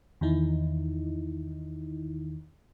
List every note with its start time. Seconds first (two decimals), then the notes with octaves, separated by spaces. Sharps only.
0.21 E2 D#3 D#4 E4